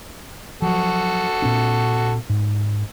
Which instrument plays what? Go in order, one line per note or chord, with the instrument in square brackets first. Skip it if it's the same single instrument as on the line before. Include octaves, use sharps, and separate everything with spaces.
[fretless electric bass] F3 F#3 [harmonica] F#4 A4
[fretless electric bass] A#2 C4 D4
G#2